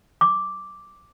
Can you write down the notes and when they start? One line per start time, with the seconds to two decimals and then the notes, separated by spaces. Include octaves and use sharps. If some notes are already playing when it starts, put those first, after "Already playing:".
0.21 D6